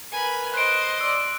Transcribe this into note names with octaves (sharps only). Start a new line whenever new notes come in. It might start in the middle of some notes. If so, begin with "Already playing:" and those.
A#4 B4 G#5 B5
C5 D#5 F#6 D7
D5 C6 E6